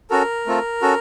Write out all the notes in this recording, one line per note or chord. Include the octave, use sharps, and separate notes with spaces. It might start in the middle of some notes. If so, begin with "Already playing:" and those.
C#4 F#4 A4 A#4
A3 C4 F4 A4
C#4 F#4 A4